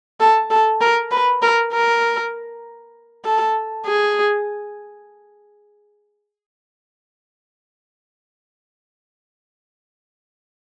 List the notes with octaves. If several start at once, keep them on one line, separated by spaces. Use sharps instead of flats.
A4
A4
A#4
B4
A#4
A#4
A4
G#4